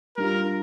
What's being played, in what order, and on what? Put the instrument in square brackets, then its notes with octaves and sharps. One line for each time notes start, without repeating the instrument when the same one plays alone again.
[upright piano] G3 D4 F4 [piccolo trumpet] A#4